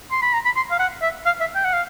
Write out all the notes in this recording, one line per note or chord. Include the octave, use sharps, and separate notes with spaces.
C6
B5
A#5
B5
C6
F5
F#5
E5
F5
E5
G5
F#5
F5